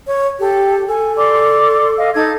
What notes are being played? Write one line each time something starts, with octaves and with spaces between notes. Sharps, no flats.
C#5
G4 A4
A4 G#5
D5 C6 D6
D#5 F5
D#4 A4 A5 G#6